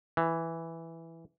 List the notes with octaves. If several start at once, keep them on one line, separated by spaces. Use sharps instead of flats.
E3